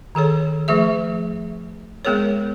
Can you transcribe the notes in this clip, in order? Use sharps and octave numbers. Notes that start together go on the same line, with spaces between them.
D#3 G#4 A4 C#5
F3 A3 G#4 E5
G#3 B3 G#4 A#4 C#5